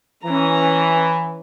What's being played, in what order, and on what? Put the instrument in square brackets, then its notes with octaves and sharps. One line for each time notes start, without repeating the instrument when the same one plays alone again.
[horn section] E3 [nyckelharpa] C#4 A#5